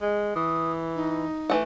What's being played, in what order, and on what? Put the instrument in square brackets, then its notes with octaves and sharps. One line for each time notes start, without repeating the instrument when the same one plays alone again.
[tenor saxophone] G#3
[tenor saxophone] E3 [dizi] D#6
[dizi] D#4
[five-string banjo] E3 A3 F#5